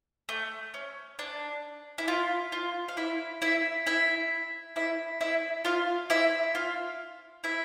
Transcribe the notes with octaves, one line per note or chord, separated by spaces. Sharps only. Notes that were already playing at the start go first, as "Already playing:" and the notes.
A3
C#4
D4
E4
F4
F4
F5
E4 E5
E4 E5
E4 E5
E4 E5
E4 E5
F4 F5
E4 E5
F4 F5
E4 E5